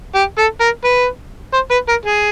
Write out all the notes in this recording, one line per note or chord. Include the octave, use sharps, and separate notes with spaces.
G4
A4
A#4
B4
C5
B4
A#4
G#4